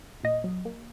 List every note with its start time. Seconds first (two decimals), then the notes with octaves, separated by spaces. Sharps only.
0.24 A#2 D#5
0.44 F#3
0.65 A#3